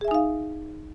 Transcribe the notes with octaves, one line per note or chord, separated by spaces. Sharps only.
D#4 G#4 E5 F5 G#5